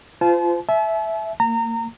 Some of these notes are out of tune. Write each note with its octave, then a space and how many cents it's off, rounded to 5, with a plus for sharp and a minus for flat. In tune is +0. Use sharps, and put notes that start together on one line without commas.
F4 -15 C5 -35 A5 -40
E5 +0 A5 -45
A#3 -30 A#5 -25